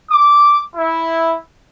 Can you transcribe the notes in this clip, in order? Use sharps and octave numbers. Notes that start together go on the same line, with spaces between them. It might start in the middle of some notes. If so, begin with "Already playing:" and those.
D6
E4